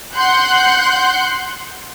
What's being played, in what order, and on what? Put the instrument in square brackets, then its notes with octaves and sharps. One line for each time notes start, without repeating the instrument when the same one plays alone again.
[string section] F#5 C6 F#6 G6